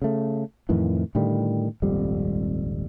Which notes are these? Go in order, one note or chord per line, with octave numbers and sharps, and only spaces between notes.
C#3 A3
F2 A2 D#3 E3
A2 D3 D#3 G3
D#1 G#1 F2 G3